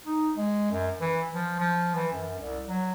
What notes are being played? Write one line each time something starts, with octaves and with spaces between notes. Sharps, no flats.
D#4
G#3
F#2
E3
F3
F3
E3
F#2
C2
F#3